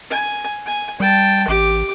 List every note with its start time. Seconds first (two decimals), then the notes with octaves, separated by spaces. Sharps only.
0.11 G#5
0.67 G#5
1.00 G3 G5 A5
1.48 A1 G4 D6